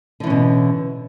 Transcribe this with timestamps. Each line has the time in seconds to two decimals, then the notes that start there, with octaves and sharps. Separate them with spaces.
0.20 D3
0.23 E3
0.27 C#4
0.30 B2